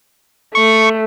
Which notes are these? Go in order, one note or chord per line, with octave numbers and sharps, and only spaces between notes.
A3 C#6